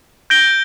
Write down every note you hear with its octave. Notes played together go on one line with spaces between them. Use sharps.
G6 A#6 D7 G7